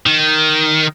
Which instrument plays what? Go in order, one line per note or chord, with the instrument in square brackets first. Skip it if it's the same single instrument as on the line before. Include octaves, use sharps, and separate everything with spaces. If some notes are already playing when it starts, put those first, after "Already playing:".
[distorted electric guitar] D#3